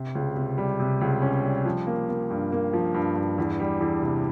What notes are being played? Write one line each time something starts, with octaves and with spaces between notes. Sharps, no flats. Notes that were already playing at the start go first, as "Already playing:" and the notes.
Already playing: C3
C#2
C3
G3
C3
C#2
C#4
G3
F3
A#3
A#3
G2
A#3
F3
G2
G2
E2
G3
E2
C3